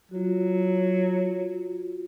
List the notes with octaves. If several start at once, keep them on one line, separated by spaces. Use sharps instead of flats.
F#3 F4 F#4